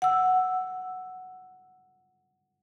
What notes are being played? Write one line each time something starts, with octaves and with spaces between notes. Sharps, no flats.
F#5 E6